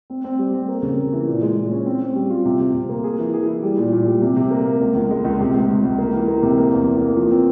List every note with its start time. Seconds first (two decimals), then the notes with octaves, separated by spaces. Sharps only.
0.10 C4
0.24 C4
0.39 G3
0.54 C4
0.68 A#3
0.82 C#3
0.97 A#3
1.13 E3
1.27 A#2
1.42 G#3
1.57 A#2
1.71 C#4
1.86 C4
2.01 C4
2.15 G3
2.30 F4
2.45 C3
2.60 C3
2.75 C3
2.89 A#3
3.04 G#4
3.19 E3
3.34 G#4
3.48 E4
3.63 G3
3.77 A#2
3.92 A#2
4.07 G3
4.22 C3
4.36 C3
4.51 A#3
4.66 A#3
4.81 C#2
4.95 C#2
5.10 G#3
5.25 C#2
5.40 C3
5.54 C#2
5.69 C#2
5.84 C#2
5.98 A#3
6.13 E3
6.28 A#3
6.43 C3
6.57 A#3
6.72 E2
6.87 E3
7.02 A#3
7.16 F3
7.31 C4